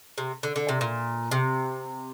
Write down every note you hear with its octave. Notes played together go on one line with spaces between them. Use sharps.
C3
D3
D3
C3
A#2
C3